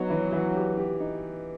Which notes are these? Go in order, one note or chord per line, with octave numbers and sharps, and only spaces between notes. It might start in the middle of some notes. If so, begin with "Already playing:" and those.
Already playing: F#3 B3 D#4
E3
E3
G4
G4
D#4